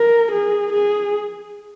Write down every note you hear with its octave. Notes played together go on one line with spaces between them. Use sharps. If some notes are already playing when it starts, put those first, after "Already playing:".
Already playing: A#4
G#4
G#4